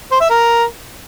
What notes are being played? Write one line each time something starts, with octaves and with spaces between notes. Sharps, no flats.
C5
E5
A#4